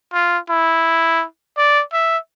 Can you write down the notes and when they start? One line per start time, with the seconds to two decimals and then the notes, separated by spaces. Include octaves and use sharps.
0.13 F4
0.49 E4
1.57 D5
1.93 E5